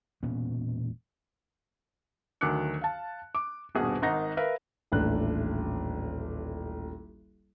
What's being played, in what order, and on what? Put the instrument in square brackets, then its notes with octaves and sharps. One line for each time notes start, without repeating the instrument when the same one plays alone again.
[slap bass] E1 A#2 B3 C#4
[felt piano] D2 D#3 F#3 D6 F#6 C#7
F5 A5
D6
D#1 G2 B2 G#4 F#5 D#6
G#1 D#3 D#4 F#5 A#6
A#4 B4 E5 F5
[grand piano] D#1 A1 D4 F#6